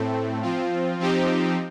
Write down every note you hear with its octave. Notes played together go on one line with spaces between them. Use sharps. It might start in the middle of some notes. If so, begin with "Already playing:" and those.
Already playing: A2 A3 C4
F3 C4 F4
F3 C4 D#4 G4